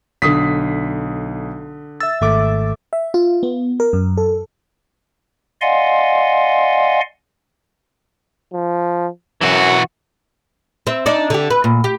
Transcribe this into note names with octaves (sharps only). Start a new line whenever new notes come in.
B1 D3 D#6 B6 C7
E5 E6 A6
G#1 A3 E5 D6
E5
F4
B3
A#4
F#2
A4
D5 D#5 F5 F#5 G#5 C6
F3
F#2 E3 F#4
C4 E5
D4 D#4 D5
D3 G4
B4
A#2
G4